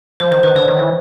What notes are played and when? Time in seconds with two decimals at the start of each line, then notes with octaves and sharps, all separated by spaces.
0.20 F3 C5
0.31 D#3 C5
0.43 D#3 B4
0.55 D3 C#5
0.68 D#3
0.79 E3